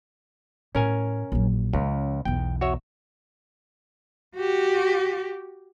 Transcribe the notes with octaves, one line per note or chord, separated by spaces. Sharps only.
A2 C#4 A#4 G#5
A#1 F#3
C#2 F3 C#4
B1 E2 G5
F#4 C#5 E5
F#4 G4